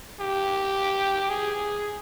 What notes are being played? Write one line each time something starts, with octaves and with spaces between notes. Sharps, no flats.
G4
G#4